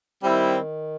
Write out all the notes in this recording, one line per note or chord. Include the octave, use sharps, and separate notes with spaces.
D#3 G3 C4 E4